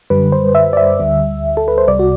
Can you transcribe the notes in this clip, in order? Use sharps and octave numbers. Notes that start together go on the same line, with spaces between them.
F#2 D3 G3 B4
C5
E5
D5
E5
D2 D3 G3
A4
B4
C5
C2 C3 G3 D5
F#4